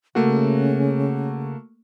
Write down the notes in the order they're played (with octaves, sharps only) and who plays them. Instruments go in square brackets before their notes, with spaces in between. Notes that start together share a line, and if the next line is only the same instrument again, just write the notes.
[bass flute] C#3 [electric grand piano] A3 A#3 F#4